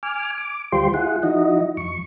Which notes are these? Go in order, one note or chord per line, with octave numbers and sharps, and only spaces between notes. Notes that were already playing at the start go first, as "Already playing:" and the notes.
G#5 D6 F6
D6
D2 G3 F4 G4 C5 C6
E4 F4 G#4 F#5
F3 D#4 E4 F#4 D#5
F2 C#6